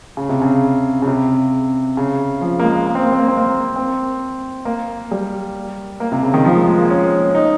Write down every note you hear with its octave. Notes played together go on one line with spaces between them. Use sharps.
C#3
C3
C#3
C#3
C3
C#3
F3
A#3
G#3
A#3
C4
A#3
C4
A#3
C4
A#3
C4
A#3
G3
A#3
C3
C#3
D#3
F3
G#3
G#3
A#3
C#4
D#4